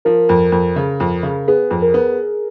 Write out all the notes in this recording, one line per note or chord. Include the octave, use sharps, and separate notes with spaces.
F3 A#4
F2
F2
C#3
F2
C#3
B3 G#4
F2
A#4
B3